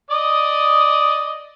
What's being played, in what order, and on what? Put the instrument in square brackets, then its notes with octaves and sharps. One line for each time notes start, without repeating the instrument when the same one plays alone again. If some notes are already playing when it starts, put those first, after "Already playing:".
[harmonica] D5 D#5 D#6